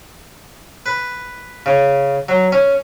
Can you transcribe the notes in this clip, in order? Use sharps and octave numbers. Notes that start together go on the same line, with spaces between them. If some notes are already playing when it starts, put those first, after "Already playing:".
B4
C#3
F#3
C#4